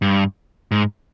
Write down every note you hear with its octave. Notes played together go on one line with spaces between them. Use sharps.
G2
G#2